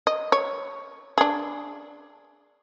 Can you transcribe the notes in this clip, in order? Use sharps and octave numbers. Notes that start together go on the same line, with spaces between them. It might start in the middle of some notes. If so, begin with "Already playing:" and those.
D#5
C#5
D4 G#4